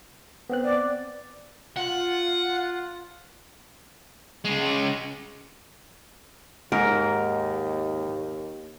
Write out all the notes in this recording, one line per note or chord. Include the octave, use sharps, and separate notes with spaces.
B3 C4 F#6
D5
F4 F#5
C#3 G#3
D#2 G#2 A#4